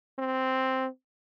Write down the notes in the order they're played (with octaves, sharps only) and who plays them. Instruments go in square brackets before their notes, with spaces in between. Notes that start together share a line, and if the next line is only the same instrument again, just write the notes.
[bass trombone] C4